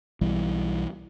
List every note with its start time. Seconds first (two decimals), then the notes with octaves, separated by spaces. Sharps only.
0.21 B1 E3 G3